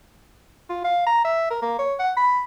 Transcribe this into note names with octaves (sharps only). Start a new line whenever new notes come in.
F4
F5
A#5
E5
A#4
A#3
C#5
F#5
B5